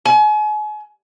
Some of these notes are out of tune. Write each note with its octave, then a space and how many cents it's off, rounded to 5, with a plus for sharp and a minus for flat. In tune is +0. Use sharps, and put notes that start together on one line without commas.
G#5 +35